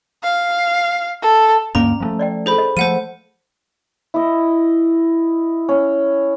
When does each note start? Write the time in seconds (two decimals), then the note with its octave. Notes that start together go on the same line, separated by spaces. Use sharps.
0.23 F5
1.23 A4
1.75 D2 G2 A#3 C#4 A#5 D6
2.00 F3 G#3 A3
2.19 D5 D#5 G5
2.46 E4 G#4 A4 C5 B5
2.58 D#5
2.77 F3 G3 A3 C5 F#5 D#7
4.14 E4 D#5
5.69 C#4